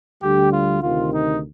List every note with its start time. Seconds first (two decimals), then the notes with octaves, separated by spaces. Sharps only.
0.23 D2 D3 G3 G4
0.53 F4
0.83 D2 C3 D#3 F4
1.13 D#4